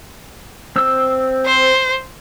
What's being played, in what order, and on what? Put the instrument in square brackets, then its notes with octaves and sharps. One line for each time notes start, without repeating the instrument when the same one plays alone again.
[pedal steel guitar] C4 E6
[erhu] C5